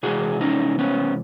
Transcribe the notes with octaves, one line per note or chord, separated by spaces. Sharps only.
C3 E3 G#3 F#4 G#4
C#4 D#4
B3 C#4